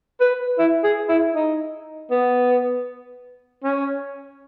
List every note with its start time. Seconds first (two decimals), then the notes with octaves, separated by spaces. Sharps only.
0.20 B4
0.58 E4
0.84 G#4
1.09 E4
1.34 D#4
2.11 B3
3.63 C#4